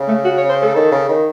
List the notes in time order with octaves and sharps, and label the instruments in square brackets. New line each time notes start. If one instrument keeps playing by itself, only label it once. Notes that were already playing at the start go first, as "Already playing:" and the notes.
Already playing: [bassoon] C#3
[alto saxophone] A3
F#4
C#5
C5
A4
[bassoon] D#3
C#3
D#3